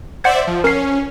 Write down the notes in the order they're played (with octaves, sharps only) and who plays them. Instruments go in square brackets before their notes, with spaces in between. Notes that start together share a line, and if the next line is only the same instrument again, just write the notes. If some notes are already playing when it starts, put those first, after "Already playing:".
[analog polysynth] C5 D5 E5 [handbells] F#5 G6 G#6
[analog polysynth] F3
[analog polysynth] C#4 [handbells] A#4 C7